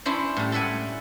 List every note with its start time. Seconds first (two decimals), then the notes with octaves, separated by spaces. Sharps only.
0.05 C#4 D4 E4 C5
0.37 A2 G3
0.52 A4 D5 E5 F#5 G#5